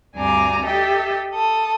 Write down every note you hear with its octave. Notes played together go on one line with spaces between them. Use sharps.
D2 G2 C4 G#5 A#5 D6
G4 A4 D#5 E5 G5
A4 D#6